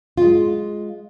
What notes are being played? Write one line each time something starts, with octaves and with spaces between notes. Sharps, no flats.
G#3 F4